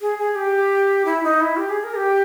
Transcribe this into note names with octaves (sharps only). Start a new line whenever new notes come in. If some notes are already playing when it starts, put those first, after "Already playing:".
G#4
G#4
G4
E4
D#4
E4
G4
G#4
A#4
G4